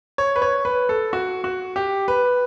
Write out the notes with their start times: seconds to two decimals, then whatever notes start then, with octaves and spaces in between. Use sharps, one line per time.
0.18 C#5
0.36 B4
0.42 C#5
0.65 B4
0.89 A4
1.13 F#4
1.44 F#4
1.76 G4
2.08 B4